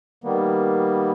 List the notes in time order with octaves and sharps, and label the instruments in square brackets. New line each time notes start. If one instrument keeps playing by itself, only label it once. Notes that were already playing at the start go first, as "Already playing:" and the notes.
[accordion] D#3 G3 A#3 B3